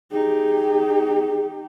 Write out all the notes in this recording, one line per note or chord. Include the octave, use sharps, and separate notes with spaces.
D#4 G4 G#4